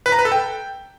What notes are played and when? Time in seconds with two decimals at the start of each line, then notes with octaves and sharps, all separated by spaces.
0.06 B4
0.12 A#5
0.19 B4
0.25 A4
0.32 G5